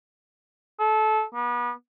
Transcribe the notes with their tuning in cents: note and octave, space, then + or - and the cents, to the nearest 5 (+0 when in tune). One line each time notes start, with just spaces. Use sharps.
A4 -25
B3 -35